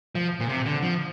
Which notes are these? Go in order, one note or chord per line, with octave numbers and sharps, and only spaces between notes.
F3
A#2
C3
D3
F3